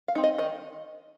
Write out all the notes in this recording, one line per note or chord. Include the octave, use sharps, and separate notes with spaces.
F5
C4 D#4
D#5
D#3 D#5